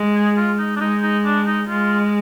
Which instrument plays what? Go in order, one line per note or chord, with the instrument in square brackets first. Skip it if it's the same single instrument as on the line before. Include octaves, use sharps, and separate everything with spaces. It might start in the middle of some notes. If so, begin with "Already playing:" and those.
Already playing: [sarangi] G#3
[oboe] G#4
F4
D#4
D4
[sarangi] G#3 [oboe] D#4
[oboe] D#4
D4
D#4
[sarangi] G#3 [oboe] F4